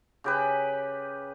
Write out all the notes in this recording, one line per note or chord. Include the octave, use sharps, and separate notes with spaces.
C#3 G4 B4